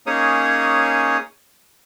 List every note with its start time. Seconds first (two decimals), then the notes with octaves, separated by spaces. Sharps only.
0.07 A#3 C#4 D#4 G#4 C#5 D#6